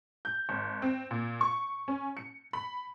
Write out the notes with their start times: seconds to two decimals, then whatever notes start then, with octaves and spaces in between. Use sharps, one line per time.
0.25 G6
0.49 G#1
0.82 C4
1.11 A#2
1.41 C#6
1.88 C#4
2.17 C#7
2.53 B5